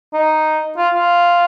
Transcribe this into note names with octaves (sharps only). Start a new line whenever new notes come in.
D#4
F4
F4